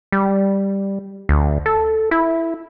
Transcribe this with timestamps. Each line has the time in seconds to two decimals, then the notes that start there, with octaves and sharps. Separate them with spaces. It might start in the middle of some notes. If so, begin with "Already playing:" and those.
0.12 G3
1.29 D2
1.66 A4
2.11 E4